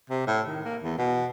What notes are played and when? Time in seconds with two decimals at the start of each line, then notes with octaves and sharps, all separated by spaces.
0.10 C3
0.27 A2
0.47 D#3
0.65 A#3
0.83 E2
0.98 B2